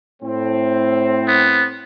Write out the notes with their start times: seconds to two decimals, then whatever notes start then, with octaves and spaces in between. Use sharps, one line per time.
0.23 A2 C4
1.28 B3